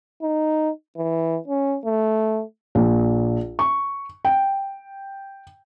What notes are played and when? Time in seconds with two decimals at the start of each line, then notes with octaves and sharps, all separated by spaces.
0.22 D#4
0.97 E3
1.48 C#4
1.85 A3
2.75 A#1
3.59 C#6
4.25 G5